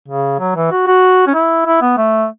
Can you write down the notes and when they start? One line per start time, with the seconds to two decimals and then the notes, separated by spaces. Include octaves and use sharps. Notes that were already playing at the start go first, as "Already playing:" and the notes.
0.08 C#3
0.40 F#3
0.56 E3
0.72 F#4
0.87 F#4
1.27 C#4
1.34 E4
1.66 E4
1.82 B3
1.98 A3